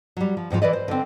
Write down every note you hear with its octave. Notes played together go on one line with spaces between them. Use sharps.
F#3 G3
F3
F2 G#2 D#3 F3
E3 B4 D5 D#5
C5
D3 C4